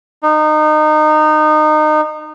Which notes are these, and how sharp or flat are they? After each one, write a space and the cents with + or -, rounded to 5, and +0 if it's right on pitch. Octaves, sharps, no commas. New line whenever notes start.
D#4 -25